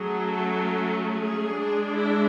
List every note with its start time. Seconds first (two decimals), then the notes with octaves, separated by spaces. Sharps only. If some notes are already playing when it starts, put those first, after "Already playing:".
Already playing: F#3 A3 C#4 G#4
0.27 A4
0.69 A4
1.11 G#4
1.53 G#3 D4
1.95 E4